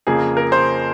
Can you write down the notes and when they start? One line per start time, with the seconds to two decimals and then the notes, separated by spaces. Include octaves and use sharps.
0.07 F2 C#3 F3 A#3 G#4
0.37 A#4
0.52 C5